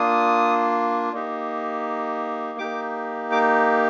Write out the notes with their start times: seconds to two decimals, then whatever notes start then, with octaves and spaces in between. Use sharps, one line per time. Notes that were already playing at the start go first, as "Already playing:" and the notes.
Already playing: A#3 D4 F4 D#6
1.14 A#3 D#4 G4
2.59 A#3 D#4 G4 D6
3.32 D6